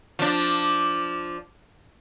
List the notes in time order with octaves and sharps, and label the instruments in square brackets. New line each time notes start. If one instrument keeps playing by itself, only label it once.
[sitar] F3 D4